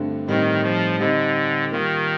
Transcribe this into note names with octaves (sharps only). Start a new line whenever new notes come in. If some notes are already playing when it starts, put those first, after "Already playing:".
Already playing: G2 D3 A3 C4
A2 D#3 G3 C4 D#4
F3
D3 G3 C4 D#4 G4
D#3 G3 A#3 F4